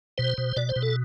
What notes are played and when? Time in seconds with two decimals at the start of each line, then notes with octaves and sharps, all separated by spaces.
0.18 B2 C5
0.38 B2
0.56 B2 D5
0.69 C5
0.76 B2
0.82 A4